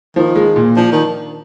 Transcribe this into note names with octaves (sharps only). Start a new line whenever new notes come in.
D#3 F3
G#3
A#2
F3 D4
D#3